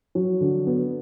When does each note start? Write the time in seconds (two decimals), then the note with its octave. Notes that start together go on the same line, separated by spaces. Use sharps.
0.15 F#3
0.41 D3
0.67 B3